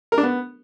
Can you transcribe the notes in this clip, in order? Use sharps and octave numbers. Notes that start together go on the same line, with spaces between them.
A#4
D4
B3